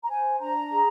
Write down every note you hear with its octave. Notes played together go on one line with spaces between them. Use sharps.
A#5
C5 G#5
D4 A#5
G#4